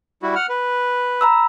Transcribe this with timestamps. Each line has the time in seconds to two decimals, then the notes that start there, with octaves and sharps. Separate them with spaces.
0.22 G3 E4 F#4
0.36 F#5 F6
0.49 B4
1.21 A#5 B5 E6